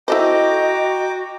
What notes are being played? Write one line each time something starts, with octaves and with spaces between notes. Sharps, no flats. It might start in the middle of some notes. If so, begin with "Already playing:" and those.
E4 F#4 A4 C5 D#5 G5 A#5 D6